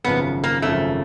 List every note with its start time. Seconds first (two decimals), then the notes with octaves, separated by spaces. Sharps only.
0.04 G#1 F#2 C#3 F3 B3
0.44 A#3
0.62 G#1 F#2 C#3 F3 A3